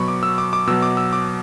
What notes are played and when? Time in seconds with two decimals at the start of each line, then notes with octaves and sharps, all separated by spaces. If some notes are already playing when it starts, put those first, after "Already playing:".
Already playing: B2 F#3 B5 C#6
0.08 D6
0.23 E6
0.38 D6
0.53 D6
0.67 B2 F#3 E6
0.82 D6
0.97 E6
1.13 D6